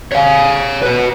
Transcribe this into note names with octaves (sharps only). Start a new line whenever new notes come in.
C#5 F5
F#4 B4